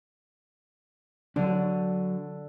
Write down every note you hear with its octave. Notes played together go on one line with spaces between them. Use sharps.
D3 F#3 D4